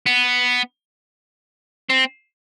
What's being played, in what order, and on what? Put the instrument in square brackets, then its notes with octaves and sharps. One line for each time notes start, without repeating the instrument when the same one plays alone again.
[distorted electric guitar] B3
C4